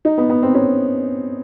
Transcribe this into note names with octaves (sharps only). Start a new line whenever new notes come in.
D#4
B3
B3
C4
C#4